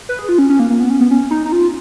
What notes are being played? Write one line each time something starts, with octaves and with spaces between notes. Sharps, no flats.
B4
G#4
F4
C#4
C#4
A#3
A#3
B3
C#4
B3
C#4
D#4
D#4
F4